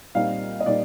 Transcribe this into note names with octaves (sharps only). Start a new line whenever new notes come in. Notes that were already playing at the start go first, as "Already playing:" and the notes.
A#2 G3 C4 D#4 F5
D#5
A#2 G3 C4 D#4 D5